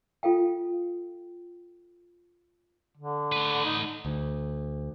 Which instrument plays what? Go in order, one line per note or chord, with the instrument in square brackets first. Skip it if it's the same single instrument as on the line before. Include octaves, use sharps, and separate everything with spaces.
[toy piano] F4 A4 F5 G5
[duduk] D3
[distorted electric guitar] A3 B4
[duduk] D#4
[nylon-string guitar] D2